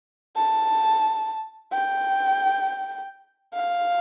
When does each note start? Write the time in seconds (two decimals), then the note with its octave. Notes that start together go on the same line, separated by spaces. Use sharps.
0.36 A5
1.72 G5
3.54 F5